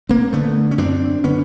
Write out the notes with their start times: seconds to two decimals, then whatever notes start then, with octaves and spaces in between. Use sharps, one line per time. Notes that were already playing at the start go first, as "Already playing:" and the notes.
0.09 A#3 C4
0.33 D3 A3 B3
0.71 C#4
0.78 F#2 C4 D4
1.24 D3 B3 C#4